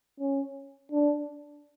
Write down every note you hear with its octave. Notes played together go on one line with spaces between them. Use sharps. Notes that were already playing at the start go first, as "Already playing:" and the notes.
C#4
D4